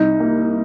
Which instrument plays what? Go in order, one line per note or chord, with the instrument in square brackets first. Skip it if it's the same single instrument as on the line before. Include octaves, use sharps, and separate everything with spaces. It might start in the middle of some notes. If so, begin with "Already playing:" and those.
Already playing: [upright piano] C2 [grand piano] D#4
[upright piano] A#3